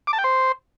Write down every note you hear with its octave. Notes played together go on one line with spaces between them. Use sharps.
D6
A5
G5
C5